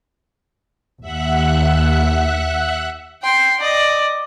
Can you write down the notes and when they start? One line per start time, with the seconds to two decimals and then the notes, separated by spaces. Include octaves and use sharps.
1.01 D#2 E5 F#5 F#6
3.22 G5 C6
3.60 D5 D#5